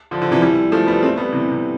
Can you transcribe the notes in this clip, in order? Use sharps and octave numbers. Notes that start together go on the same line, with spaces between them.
D3 F3
D3 F3
C3 E3
E3 G3
F3 A3
G3 B3
A3 C4
G3 B3
C3 E3
C3